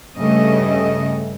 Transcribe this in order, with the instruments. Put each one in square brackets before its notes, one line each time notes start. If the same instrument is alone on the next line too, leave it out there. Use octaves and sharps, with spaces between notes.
[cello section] G2 C#3 A3 D#5